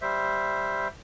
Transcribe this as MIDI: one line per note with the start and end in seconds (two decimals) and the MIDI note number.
0.02 0.88 55
0.02 0.88 72
0.02 0.88 76